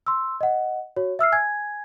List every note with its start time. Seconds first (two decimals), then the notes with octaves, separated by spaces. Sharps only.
0.07 C6 E6
0.41 D#5 F#5
0.96 F#4 C#5
1.19 E5 E6 F6 C7
1.32 G#5 G#6